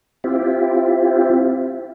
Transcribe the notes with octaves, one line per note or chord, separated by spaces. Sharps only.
C4 E4 F4 G4